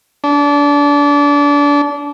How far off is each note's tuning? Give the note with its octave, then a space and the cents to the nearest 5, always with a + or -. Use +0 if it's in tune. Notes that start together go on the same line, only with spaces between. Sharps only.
D4 -25